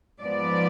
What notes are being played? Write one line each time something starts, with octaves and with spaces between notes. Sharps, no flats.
G#2 F3 B3 D5